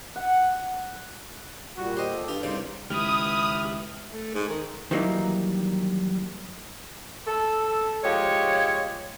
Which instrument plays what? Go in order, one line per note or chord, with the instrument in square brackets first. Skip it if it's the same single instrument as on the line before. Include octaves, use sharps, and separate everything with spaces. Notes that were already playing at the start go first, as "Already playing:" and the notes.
[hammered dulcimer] F#5
[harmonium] A#2 G3 [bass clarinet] F#4
[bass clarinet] G4 [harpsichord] C5 D#5
[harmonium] A4
[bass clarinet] G2 [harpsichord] F4 G4
[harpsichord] C2 C#3 G3 [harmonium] D#4 C5 D5
[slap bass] C#2 D#3 [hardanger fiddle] E4 B4 [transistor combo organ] G4 F6 [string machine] D#6
[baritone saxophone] A3
G#2
D#3
[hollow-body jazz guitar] D#3 E3 F#3 G3 A#3 D#4
[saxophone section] A4
F3 G#3 G4 C#5